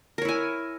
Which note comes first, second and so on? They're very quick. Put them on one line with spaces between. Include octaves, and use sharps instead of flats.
A#4 C#5 E4 G#5